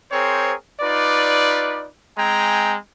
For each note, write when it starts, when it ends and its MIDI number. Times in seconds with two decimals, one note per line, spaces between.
0.12 0.53 60
0.12 0.53 68
0.12 0.53 70
0.12 0.53 72
0.12 0.53 73
0.81 1.87 63
0.81 1.87 65
0.81 1.87 71
0.81 1.87 74
2.17 2.76 56
2.17 2.76 60
2.17 2.76 79
2.17 2.76 80
2.17 2.76 82